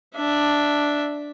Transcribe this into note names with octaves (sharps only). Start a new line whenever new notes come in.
D4 E5